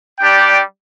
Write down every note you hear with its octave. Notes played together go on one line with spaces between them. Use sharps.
G3 D4 G4 D5 G5